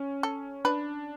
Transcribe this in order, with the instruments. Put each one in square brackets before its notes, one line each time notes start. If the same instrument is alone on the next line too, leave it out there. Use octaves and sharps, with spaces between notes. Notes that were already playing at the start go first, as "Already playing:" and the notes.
Already playing: [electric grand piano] C#4
[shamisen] A4
[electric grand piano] D4 [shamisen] B4